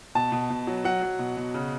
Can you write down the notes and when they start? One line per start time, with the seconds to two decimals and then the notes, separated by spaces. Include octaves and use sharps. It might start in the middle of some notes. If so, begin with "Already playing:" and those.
0.15 B2 A5
0.32 B2
0.50 B2
0.67 F#3
0.85 F#3 F#5
1.02 F#3
1.19 B2
1.36 B2
1.54 C#3